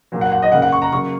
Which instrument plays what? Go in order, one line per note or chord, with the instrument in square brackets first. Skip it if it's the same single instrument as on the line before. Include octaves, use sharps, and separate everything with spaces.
[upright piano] A#2 F#3 A#3
F#5
F#5
D#5
C#3 A#3 F#5
F#5
C#6
A#5
C#3 F#3 A#3 C#6